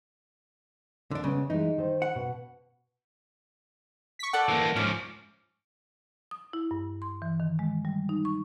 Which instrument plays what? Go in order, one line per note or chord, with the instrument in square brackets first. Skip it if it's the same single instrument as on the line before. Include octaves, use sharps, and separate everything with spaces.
[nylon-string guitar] D#2 [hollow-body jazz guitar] D3 D4
[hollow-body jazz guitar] C#3 [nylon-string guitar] G#3 B3
[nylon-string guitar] E3 G#3 [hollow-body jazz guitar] D#4
[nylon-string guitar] D#3 A4 C5
[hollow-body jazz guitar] F#5
[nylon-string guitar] B2
[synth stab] C#6 B6
[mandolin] A3 A4 D5 [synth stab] F#5
[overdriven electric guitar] E3 A#3
[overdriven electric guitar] G#2 F3 [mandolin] C#4 D5
[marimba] D#6
E4
G2
C6
E3
D#3
G#3
G3
D#4
C#6